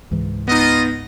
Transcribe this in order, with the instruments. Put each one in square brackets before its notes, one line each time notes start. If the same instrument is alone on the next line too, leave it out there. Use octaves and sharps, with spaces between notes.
[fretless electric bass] C#2 G#2 E3
[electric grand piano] B3 D#4 [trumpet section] F4 D#5